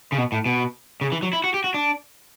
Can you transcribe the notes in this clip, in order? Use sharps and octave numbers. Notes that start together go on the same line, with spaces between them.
C#3
B2
A2
B2
C#3
E3
F#3
E4
F#4
G4
F#4
D4